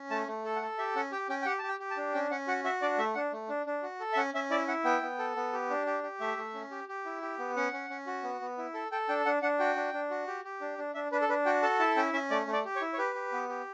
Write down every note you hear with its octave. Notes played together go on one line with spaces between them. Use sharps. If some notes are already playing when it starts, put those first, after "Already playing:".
Already playing: C#4
A3 A5
A3
A4
F#5
A4
G4 E5
C#4 F#5
G4 G5
C#4 G5
G5
G4 F#5
G4 A5
G5
G4
A5
D4
C#4 G5
C#4 F#5
F#4 F#5
F#4 E5
D4 D5
A3 E5
D4 F#5
A3
D4
D4
F#4
A4
E5
C#4 F#5
C#4 E5
E4 D5
E4 F#5
B3 G5
B3
A4
B3
G4
D4
G4
G4
A3 E5
A3
C#4
G4
G4
E4
G4
B3
C#4 F#5
C#4
C#4
F#4
B3
B3
E4
A4
A4 G5
D4 G5
D4 F#5
D4 F#5
F#4 G5
D4
D4
F#4
G4
G4
D4
D4
D4 E5
D4 B4
A4
D4 B4
F#4 G5
A4 A5
E4 A5
C#4 G5
C#4 E5
A3 D5
A3
D5
G4
C#5
E4
C#5
G4 B4
G4
B3
G4